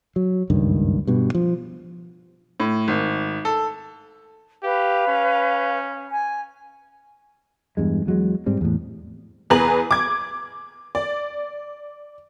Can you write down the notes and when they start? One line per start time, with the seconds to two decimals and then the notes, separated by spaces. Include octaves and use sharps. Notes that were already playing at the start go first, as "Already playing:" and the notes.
0.16 F#3
0.50 F#1 C#2 G2 D#3
1.07 G2 B2
1.35 F3
2.60 A2
2.88 G#1
3.45 A4
4.63 G4 B4 F5
5.08 C#4
6.12 G#5
7.77 E2 G2 G#3
8.06 E2 F#3 G#3
8.46 G#2 G3 C4
8.61 E2 A2
9.50 E2 G#4 B4 A#5 F#7
9.91 D6 G#6
10.95 D5